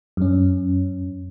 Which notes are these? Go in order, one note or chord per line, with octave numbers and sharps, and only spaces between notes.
F#2 C#4